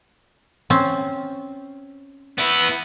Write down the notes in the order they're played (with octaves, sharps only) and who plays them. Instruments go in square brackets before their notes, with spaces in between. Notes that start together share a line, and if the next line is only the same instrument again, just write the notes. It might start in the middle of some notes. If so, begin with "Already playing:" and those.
[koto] C4 C#4
[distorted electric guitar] B3 E4